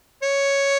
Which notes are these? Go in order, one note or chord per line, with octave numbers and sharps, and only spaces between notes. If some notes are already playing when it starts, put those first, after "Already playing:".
C#5